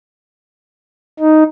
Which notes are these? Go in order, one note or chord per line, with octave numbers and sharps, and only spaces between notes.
D#4